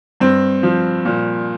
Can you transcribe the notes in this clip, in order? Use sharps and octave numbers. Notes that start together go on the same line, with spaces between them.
G2 C4
F3
A#2